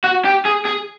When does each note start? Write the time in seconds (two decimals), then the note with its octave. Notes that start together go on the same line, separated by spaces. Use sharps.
0.04 F#4
0.25 G4
0.45 G#4
0.65 G#4